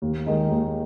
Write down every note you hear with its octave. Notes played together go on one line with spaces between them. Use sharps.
D#2
D#3 G#3 D#4
D#2